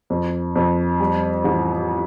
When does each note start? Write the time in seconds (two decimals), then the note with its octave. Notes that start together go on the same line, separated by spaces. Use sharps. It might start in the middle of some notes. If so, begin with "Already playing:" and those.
0.10 F2
0.55 F2
1.00 G3
1.44 A1